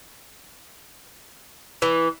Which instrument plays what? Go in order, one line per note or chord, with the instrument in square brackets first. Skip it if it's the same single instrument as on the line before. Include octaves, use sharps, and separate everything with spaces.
[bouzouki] E3